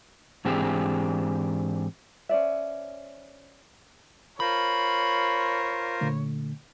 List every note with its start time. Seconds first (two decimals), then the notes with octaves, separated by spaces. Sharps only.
0.45 G#2 E3 C4 D4 G4 G#4
2.29 C#4 C5 D5 E5
4.40 F4 A#4 C5 C#5 B5
6.01 A#2 D3 A3